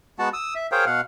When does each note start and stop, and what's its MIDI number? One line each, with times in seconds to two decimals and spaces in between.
0.19 0.29 56
0.19 0.29 59
0.19 0.29 66
0.19 0.29 78
0.19 0.29 81
0.33 0.54 87
0.33 0.54 88
0.55 0.67 76
0.72 0.85 68
0.72 0.85 70
0.72 0.85 72
0.72 0.85 73
0.72 0.85 77
0.72 0.85 79
0.86 1.01 47
0.86 1.01 77
0.86 1.01 78